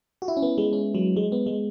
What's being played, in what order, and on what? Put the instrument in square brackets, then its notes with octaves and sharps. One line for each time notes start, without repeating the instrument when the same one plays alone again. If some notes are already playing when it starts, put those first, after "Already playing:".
[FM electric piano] F#4
E4
C#4
B3
G#3
C#4
F#3
G#3
B3
G#3